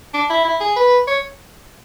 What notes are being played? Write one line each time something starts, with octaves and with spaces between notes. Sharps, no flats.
D4
E4
E4
G#4
B4
C#5